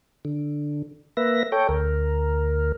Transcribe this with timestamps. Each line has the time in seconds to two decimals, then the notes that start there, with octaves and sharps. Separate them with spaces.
0.25 D3
1.17 A#3 B4 E5 A#6
1.52 A4 C#5 G5
1.69 D2 A#4